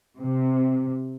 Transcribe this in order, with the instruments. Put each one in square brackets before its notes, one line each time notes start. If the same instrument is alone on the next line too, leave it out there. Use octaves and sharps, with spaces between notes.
[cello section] C3